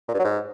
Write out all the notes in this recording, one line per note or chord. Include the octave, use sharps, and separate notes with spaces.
A#2
G2
F#3
G#2